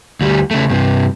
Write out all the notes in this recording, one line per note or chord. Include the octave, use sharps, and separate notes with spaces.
D2 G3
C#3 A3
G2 C3